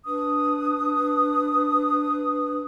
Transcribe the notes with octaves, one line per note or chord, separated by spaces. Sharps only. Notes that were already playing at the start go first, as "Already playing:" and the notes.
D4 B4 D#6